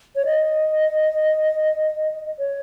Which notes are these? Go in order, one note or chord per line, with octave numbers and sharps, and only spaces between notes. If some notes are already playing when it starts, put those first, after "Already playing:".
C#5
D#5
C#5